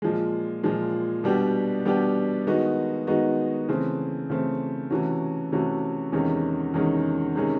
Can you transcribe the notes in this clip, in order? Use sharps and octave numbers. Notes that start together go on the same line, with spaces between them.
A#2 F3 G#3
A#2 F3 G#3
B2 G3 B3 D4 G4
B2 G3 B3 D4 G4
D#3 G#3 B3 D#4 F#4
D#3 G#3 B3 D#4 F#4
C#3 E3 A3 C4
C#3 E3 A3 C4
C3 E3 A3 C#4 F#4
C3 E3 A3 C#4 F#4
E2 C3 D#3 G#3 C#4
E2 C3 D#3 G#3 C#4
C3 D#3 G#3 C#4